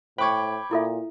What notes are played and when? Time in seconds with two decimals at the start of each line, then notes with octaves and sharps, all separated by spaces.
0.18 A2 C5 G5 B5 C#6 D6 G#6
0.71 A#2 E4 A4 E5